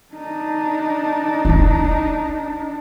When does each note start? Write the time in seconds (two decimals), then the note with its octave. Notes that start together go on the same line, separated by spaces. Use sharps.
0.15 D4 D#4
1.45 E4 F4